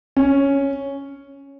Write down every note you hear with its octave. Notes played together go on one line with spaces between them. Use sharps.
C#4